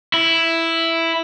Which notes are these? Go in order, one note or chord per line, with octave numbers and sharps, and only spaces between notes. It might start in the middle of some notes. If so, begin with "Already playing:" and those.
E4